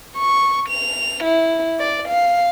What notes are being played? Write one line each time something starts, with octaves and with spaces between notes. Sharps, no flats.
C#6
F7
E4
D5
F5